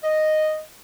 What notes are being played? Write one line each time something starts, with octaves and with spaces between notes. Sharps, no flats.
D#5